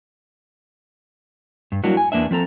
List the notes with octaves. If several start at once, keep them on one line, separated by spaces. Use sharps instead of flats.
G2
F#3 G3 A#3 D4 E4 F#4
G#5
E2 A#3 B3 D4 E5
F3 C4 A4 A#5